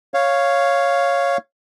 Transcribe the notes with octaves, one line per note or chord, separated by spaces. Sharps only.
C#5 F5